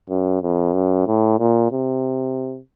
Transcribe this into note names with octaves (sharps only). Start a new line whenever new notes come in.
F#2
F2
F#2
A2
A#2
C3